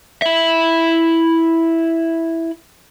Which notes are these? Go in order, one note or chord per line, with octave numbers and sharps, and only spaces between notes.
E4 E5